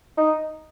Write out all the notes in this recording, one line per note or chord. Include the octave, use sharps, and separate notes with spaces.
D#4